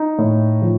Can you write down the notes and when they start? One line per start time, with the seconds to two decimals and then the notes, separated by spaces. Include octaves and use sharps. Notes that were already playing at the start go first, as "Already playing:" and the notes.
Already playing: D#4
0.18 A2
0.62 F3